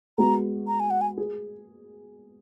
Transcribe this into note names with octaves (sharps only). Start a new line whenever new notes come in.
G#3 B3 F#4 A#5
A#5
G#5
F#5
G#5
G#4